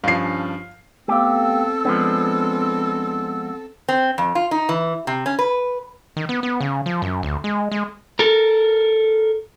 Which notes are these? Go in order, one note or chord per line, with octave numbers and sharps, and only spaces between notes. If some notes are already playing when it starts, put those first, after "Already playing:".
G2 F3 C#4 D4 F5 C7
A3 B3 C4 G4 A4 F5 E6
F3 G#3 B3 D4
C4
F2
F4
D#4
E3
C3
C#4
B4
D#3
B3
B3
C#3
F3
F#2
D2
G#3
G#3
A4 A#4